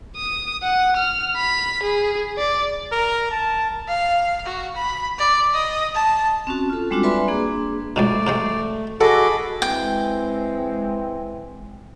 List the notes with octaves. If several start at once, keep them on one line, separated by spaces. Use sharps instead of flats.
D#6
F#5
F6
B5
G#4
D5
A#4
A5
F5
F#4
B5
D5
D#5
A5
C4 C#4 F#4
F4 A4
G3 G#3 C4 D4 F4 F#4
B4 D5 E5 G#5 B5 C6
A#3 D4 G#4
C#2 G#2 B2 A3 D5
G#2 C3 G#3
F#4 G#4 A4 D#5 F#5 B5 D6
E3 G#3 C4 G5